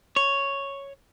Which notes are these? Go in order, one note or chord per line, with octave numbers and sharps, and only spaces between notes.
C#5